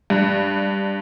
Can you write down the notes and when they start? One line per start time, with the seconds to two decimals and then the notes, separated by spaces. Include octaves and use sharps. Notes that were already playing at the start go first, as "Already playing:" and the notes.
0.10 G2